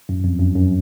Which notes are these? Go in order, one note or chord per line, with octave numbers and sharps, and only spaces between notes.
F#2
F2
F#2
F#2